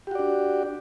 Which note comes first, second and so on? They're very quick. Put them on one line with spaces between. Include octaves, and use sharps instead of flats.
G4 F#4 D5 D4